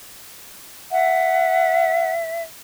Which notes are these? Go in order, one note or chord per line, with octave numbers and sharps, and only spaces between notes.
E5 F#5